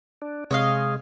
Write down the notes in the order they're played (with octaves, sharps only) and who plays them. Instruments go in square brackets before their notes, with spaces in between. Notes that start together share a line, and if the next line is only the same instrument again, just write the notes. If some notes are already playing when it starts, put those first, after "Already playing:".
[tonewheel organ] D4
[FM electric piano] C3 [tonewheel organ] G#3 [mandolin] C#5 D#5 F5